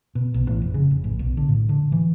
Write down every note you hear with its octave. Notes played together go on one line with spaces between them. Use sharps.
B2
B1
A1
F1
C#3
F1
A1
B1
D3
A2
D3
E3